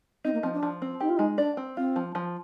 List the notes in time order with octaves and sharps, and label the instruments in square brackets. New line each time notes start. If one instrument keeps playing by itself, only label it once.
[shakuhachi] C4 [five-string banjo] D#4
[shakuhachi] A#3
[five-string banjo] F3 [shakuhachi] C4
[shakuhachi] D4
[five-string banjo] F3
C4
[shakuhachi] D#4 [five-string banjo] G4
[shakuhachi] F4
[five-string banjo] G#3 [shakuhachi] D#4
[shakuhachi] D4 [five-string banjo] D5
[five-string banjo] C4
[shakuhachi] C4 [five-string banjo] F4
[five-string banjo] F3
F3